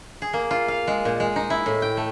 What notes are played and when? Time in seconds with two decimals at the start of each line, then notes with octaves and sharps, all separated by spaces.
0.22 G#4
0.33 A#3
0.51 F4
0.68 F5
0.87 G#3
1.05 A#2
1.20 G#3
1.36 D#4
1.50 E4
1.66 A2
1.82 G5
1.97 A3